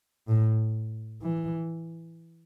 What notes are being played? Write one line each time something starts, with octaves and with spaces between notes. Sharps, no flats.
A2
E3